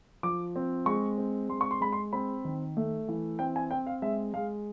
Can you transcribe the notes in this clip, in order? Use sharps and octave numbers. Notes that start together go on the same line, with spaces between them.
F3 D6
C4
G#3 C#6
C4
G#3 C6
C#6
C6
G#3 B5
C6
C4 B5
D#3
A3
E3
C4 G5
G#5
C4 G5
F5
G#3 E5
G#3 F5